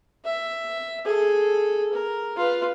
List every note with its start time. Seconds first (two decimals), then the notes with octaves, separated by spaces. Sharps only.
0.25 E5
1.05 G#4 A4
1.93 A#4
2.37 F4 B4